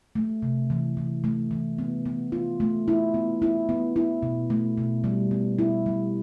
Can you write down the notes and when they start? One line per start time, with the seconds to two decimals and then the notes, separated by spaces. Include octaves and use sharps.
0.15 A3
0.43 C3
0.70 E3
0.97 E3
1.24 A3
1.51 E3
1.78 B3
2.06 B3
2.32 F4
2.60 A3
2.88 E4
3.14 B3
3.42 E4
3.69 B3
3.96 E4
4.23 B2
4.50 A3
4.78 B2
5.04 G3
5.31 B3
5.59 E4
5.86 G3